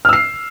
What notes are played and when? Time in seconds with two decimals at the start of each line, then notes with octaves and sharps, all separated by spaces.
0.05 F6
0.09 E6
0.13 C7